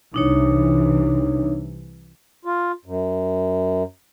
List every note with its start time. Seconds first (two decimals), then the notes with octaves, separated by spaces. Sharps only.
0.14 C2 C3 E3 D4 D#4 C#5
2.45 F4
2.85 F#2